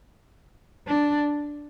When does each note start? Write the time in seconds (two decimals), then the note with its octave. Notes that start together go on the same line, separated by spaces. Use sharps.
0.87 D4